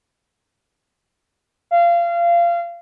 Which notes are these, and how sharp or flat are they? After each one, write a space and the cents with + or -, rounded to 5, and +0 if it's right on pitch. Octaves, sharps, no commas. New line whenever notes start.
F5 -25